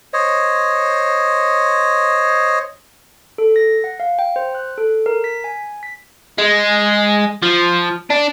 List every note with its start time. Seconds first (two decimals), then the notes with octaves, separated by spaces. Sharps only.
0.13 C5 C#5 D#5
3.38 A4
3.56 A#6
3.84 F#5
4.00 F5
4.19 G5
4.36 C5
4.55 F#6
4.78 A4
5.06 A#4
5.24 B6
5.44 G#5
5.83 B6
6.38 G#3
7.42 F3
8.10 D4